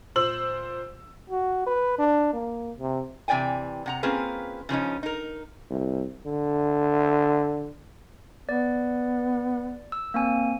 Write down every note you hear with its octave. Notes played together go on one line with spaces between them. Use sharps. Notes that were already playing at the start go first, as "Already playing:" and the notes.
A#2 C5 E6 F#7
F#4
B4
D4
A#3
C3
C3 E3 D5 G5 G#5
C3 F#5 A#5
A#3 C4 C#4 F4 G#4 B4
C#3 F3 C#4 D#4
D#4 A#4
C2
D3
B3 D5
E6
A#3 C4 G#5